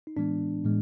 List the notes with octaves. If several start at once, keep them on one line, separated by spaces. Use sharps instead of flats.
D#4
A2 E3 G#3 B3 D4
A2 E3 G#3 B3